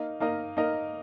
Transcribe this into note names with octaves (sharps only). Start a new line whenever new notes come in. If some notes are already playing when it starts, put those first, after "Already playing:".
Already playing: A#3 D#4 A#4 D#5
A#3 D#4 A#4 D#5
A#3 D#4 A#4 D#5